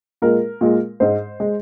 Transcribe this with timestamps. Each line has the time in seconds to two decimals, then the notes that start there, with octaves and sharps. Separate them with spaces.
0.22 A#2 G#3 A#4
0.61 A#2 G#3
1.00 G#2 G#3 C5
1.40 G#3